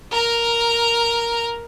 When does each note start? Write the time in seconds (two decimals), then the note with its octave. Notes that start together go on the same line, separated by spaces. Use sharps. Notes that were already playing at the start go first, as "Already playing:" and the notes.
0.11 A#4 A#5